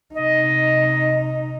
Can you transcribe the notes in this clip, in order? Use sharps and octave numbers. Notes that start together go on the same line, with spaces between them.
C3 D#4 D#5